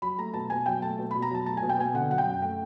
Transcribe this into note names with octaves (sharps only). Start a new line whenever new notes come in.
F#3 B5
A3 A#5
B2 A5
B2 G#5
F#3 G5
A3 A5
B2
B2 B5
A#5
F#3 A5
A3 A5
G#5
B2
G5
B2 G#5
D3 F#5
F#3 F#5
G5
F#2
A3 G5